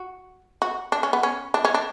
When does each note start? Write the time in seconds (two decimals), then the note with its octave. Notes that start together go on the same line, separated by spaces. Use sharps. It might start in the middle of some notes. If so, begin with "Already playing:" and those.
Already playing: F#4
0.62 F#4
0.92 D4
1.03 C#4
1.13 B3
1.23 C#4
1.54 D4
1.65 C#4
1.74 D4